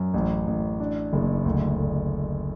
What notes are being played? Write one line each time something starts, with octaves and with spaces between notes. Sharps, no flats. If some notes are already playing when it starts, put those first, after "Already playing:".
Already playing: F#2
A1
A1
D4
F#1
D2
D2